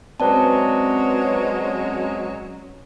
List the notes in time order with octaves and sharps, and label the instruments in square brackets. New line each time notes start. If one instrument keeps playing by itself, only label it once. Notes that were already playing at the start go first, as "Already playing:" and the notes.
[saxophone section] F#3 G#3 C#4 [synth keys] C4 B4 C5 [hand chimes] D5 A5